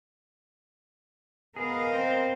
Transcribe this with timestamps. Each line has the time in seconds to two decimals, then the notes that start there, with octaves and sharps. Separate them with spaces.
1.56 B3 G#4 A#4 D#5 F5
1.93 C4 C5